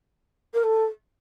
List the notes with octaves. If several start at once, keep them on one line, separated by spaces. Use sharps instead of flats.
A#4
A4